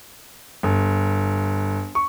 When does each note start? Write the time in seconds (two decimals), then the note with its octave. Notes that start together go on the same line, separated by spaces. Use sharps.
0.63 G1
1.95 C#6